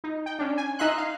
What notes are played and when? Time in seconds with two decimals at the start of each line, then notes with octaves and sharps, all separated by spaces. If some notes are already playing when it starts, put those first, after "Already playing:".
0.04 D#4
0.26 G5
0.39 C#4 D4
0.58 G#5
0.79 D#4 D#5 E5 C6 F#6
0.98 F5